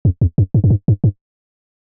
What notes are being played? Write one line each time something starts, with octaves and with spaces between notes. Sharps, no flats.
F2
E2
F#2
G2
F#2
G2
G2
G2